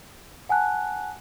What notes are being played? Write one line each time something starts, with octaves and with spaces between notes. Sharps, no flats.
F#5 G#5 A5 F#6